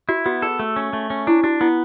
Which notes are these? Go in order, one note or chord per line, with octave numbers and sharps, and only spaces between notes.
E4 F#4
B3 F#4
G#4 A4
A3
C#4
A3
C#4
D4 E4
D4 F#4
B3 E4